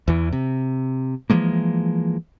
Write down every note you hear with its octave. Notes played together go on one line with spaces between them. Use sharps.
E2 E3
C3
E3 F3 G#3 A#3